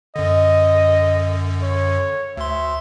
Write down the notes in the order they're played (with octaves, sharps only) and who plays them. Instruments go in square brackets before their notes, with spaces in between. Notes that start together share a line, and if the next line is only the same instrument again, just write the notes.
[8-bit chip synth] F#2 D3 [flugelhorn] D#5
[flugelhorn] C#5
[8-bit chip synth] D2 C6 [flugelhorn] E5